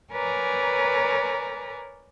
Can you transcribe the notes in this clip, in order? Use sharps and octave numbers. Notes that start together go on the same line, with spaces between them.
A#4 B4 C#5 D5 G#5 A#5